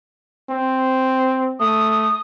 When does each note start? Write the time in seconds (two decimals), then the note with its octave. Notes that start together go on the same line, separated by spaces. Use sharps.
0.50 C4
1.60 A3 D#6